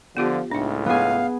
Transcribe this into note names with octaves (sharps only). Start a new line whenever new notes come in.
D3 F3 B3 F4 G4
C#2 A2 D4 D#4
B3 G#4 F5